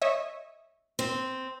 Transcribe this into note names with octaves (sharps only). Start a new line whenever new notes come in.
C#5 D#5 E5
C4